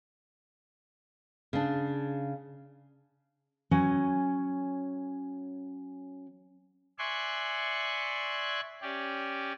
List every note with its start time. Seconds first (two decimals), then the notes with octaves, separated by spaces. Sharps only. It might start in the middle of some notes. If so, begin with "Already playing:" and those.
1.53 C#3 D4
3.71 F#3 C#4 G#5
6.99 D5 E5 G#5 C6 C#6 F#6
8.82 C#4 G4 D5